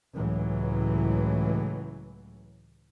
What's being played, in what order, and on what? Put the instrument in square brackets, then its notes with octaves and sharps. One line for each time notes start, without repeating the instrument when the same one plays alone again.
[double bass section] C#2 A2 E3 F#3